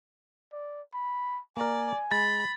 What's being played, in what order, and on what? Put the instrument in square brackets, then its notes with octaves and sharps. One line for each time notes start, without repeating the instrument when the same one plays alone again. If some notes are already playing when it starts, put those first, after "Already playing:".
[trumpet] D5
B5
[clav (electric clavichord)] A#3 A#4 [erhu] D5 [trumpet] G#5
[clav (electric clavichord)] G#3 [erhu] B5 [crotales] A6